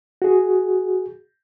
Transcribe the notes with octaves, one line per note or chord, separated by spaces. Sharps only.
F#4 G#4